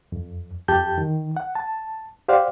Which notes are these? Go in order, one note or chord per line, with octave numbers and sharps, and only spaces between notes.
F2
F2 G4 A5 G6
D#3
F#5
A5
G4 C5 D5 F5 F#5